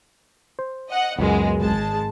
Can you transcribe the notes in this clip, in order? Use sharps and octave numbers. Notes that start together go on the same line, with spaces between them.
C5
D#5 F#5
C#2 F#2 G#3 B3
G#1 G#3 A5